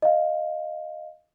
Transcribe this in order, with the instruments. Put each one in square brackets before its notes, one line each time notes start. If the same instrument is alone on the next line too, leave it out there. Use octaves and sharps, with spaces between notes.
[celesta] D#5 F5